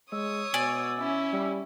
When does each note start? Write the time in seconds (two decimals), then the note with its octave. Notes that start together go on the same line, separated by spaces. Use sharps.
0.12 G#3 C#5 D#6 E6
0.54 B2 D5 G#5
0.99 C#4 E4
1.33 G3